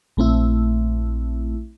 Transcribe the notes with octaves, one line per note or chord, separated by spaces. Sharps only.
A#1 A3 C4 E4